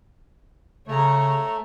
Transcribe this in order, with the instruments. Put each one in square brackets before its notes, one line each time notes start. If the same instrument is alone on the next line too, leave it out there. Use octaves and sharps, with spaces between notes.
[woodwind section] C#3 [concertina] A3 [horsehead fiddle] C#5 A#5